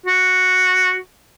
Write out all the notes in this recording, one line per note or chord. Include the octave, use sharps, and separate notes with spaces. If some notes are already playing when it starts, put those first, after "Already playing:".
F#4